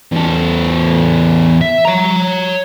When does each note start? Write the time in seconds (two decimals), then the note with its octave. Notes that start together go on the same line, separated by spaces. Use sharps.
0.12 E2 A4
1.62 E5
1.85 C#5 A#5